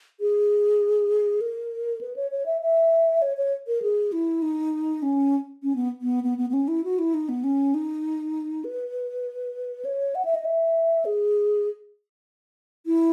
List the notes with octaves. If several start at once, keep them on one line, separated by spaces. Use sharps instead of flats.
G#4
A#4
B4
C#5
C#5
E5
E5
C#5
C#5
A#4
G#4
E4
D#4
C#4
C#4
B3
B3
B3
B3
B3
C#4
E4
F#4
E4
D#4
B3
C#4
D#4
B4
C#5
F#5
E5
D#5
E5
G#4
E4